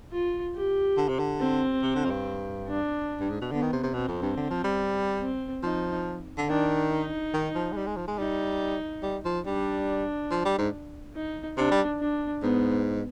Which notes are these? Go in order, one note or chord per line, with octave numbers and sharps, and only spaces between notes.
F4
G4
D3
C3
D3
C4
C3
D3
F2
G2
D4
G2
G#2
B2
D3 B3
D#3
C3
C3
B2 C4
F2
G2
D3
F3
G3
C4
F3 D#4
D3
D#3 D4
D#4
D#3
F3
G#3
G3
G#3
F3
G#3
G3 D#4
G3
F3
G3 D4
F3
G3
G#2
D#4
C3 D4
G3
D4
G#2 B3